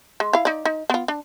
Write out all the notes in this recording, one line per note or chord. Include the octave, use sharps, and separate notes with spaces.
G#3
E4 F5
D#4 D5
D#4
B3 F4
D4